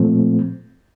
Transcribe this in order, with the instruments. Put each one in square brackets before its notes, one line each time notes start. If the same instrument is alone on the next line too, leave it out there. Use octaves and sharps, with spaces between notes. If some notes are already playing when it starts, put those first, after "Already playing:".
Already playing: [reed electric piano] A#2 F3 A3 C4